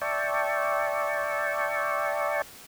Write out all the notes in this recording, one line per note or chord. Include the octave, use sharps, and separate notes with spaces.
D5 E5 G5 A5 C#6